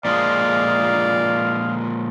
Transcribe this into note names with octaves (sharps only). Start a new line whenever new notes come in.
A#2 F3 G#3 D5 F5